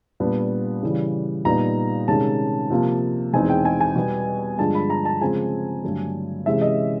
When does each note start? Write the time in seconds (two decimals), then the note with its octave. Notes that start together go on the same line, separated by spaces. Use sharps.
0.20 A#2 G3 B3 D4
0.82 C#3 E3 G3
1.45 A#2 G3 B3 D#4 A#5
2.08 C3 D#3 G#3 C#4 A5
2.70 C3 F3 A#3
3.33 E2 B2 G#3 C4 D#4 G#5
3.50 G5
3.65 G#5
3.81 G#5
3.95 B2 G3 B3
4.58 G2 D3 F3 G#3 A5
4.75 B5
4.90 A#5
5.05 A5
5.21 C#3 F3 G#3 C4 G#5
5.84 G2 D3 F#3 A3
6.46 C3 E3 G#3 C#4 E5
6.62 D#5